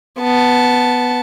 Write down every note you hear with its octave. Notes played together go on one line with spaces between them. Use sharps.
B3 A5